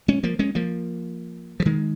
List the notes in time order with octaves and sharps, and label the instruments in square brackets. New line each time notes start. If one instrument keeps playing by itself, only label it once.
[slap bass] G#3 C#4
F3 A#3
G#3 C#4
F3 A#3
F3
D#3 G#3